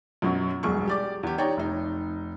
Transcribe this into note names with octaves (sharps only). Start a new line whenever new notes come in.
F#2 B2 F#3 C#4
E1 B1 G2 G#4 C#6
G4 D5 D6
E2 G4
D#4 C#5 D5 G5 A#5
F1 D#4